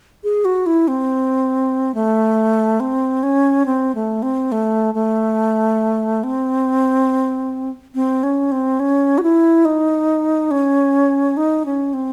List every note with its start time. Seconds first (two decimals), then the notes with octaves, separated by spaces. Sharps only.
0.24 G#4
0.45 F#4
0.66 E4
0.88 C4
1.95 A3
2.80 C4
3.23 C#4
3.66 C4
3.95 A3
4.23 C4
4.52 A3
4.94 A3
6.24 C4
7.95 C4
8.23 C#4
8.52 C4
8.80 C#4
9.18 F#4
9.23 E4
9.65 D#4
10.51 C#4
11.37 D#4
11.66 C#4
11.93 C4